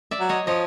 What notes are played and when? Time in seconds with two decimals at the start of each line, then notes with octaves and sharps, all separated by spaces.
0.11 D5 E5
0.20 F#3
0.29 C#5 D#5
0.47 F3 C#5 D#5